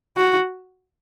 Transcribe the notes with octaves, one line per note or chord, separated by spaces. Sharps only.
F#4